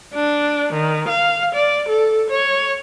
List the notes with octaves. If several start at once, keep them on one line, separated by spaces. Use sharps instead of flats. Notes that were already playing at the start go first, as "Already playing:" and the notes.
D4
D#3
F5
D5
A4
C#5